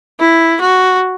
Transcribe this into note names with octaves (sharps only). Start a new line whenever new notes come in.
E4
F#4